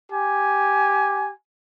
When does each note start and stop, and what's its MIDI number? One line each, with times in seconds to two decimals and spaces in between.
0.11 1.32 67
0.11 1.32 80